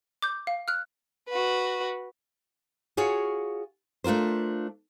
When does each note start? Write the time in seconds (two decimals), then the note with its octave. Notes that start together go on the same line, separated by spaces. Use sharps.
0.22 D6 G6
0.47 F5
0.68 F6 F#6
1.29 F#4 B4
2.97 F4 F#4 G#4 C#5
4.04 A3 D4 F4 A#4 C5